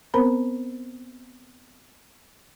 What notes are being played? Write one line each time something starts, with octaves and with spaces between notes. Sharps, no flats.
B3 C4 A#4 C5 A#5 B5